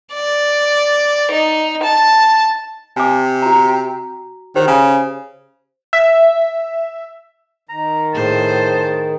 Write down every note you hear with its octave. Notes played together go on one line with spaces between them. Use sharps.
D5
D#4
A5
C3 G#5 D6
F#4 A#5
D#3 G4 C5
C#3
E5
D#3 A#5
A2 G#4 C5 A5